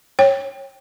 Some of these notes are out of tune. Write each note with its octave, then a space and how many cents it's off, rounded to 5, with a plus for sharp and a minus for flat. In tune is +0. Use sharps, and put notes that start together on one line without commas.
C#5 -15 G5 +0